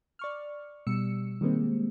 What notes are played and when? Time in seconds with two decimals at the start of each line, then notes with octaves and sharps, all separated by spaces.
0.19 D5 C#6 F6
0.87 B2 G3 E6 C#7
1.41 D#3 G3 G#3 A#3 C4